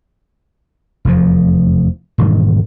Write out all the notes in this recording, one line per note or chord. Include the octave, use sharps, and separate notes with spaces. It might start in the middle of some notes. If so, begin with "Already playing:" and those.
F1 E2 F3
E1 G#2 D#3 G3